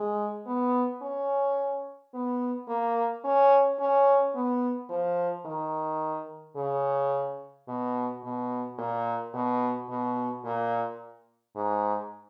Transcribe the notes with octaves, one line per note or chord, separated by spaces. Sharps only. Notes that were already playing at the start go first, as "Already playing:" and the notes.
Already playing: G#3
B3
C#4
B3
A#3
C#4
C#4
B3
F3
D#3
C#3
B2
B2
A#2
B2
B2
A#2
G#2